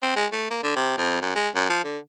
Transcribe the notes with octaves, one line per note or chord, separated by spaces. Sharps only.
C4
G#3
A3
A#3
D3
C3
F2
F#2
G#3
F#2
F3
D3